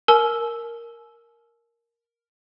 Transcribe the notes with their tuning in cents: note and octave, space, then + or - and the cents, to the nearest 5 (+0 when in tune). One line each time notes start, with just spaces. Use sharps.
A#4 +0 G#5 +45 E6 +0